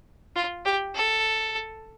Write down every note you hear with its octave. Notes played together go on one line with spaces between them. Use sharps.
F4
G4
A4